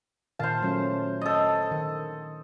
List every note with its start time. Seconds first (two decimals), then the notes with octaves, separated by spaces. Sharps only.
0.39 A#2 D#3 C5 F5 A5
0.62 F#3 A3 C#4
1.21 A4 D#5
1.71 D#3